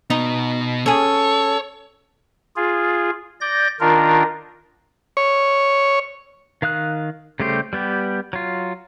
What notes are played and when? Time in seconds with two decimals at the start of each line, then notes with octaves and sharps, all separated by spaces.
0.10 B2 B3 D#4
0.86 C#4 G#4 A4 C#5 E6
2.56 F4 G#4
3.41 D5 G6 A#6
3.80 D#3 D4 F4 A#4
5.17 C#5
6.62 D#3 F5 D#6 F#6
7.40 C#3 G3 A3 G4 C5
7.73 G3 B3 G4
8.33 F#3 F4